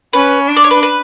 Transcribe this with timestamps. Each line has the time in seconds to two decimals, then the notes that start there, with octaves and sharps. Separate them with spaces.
0.13 C#4 B4
0.48 D4
0.56 D5
0.64 C#5
0.71 B4
0.83 B4